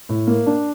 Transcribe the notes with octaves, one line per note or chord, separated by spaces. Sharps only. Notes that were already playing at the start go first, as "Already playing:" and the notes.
A2
A#3
D4